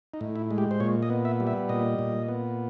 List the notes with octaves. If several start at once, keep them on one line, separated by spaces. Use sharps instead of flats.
D#4
A2
E4
G#3
G4
C5
A#2 C#5
D#5
B3
E5
G3
E5
A#2 D#5
A#2
B3